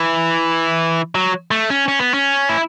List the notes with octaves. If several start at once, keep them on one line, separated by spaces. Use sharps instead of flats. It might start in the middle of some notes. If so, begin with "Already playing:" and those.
Already playing: E3
F#3
A3
C#4
C#4
B3
C#4
E4